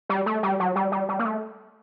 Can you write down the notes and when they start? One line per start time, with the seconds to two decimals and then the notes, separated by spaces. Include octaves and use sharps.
0.09 G3
0.26 A3
0.43 G3
0.60 F#3
0.76 G3
0.92 G3
1.09 G3
1.19 A#3
1.25 A3